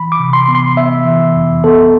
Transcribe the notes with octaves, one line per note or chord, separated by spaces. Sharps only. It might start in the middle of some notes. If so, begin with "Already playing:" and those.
Already playing: E3 B5
D6
C3
C6
B3
C6
B3 E5
E3
F2
B3 A4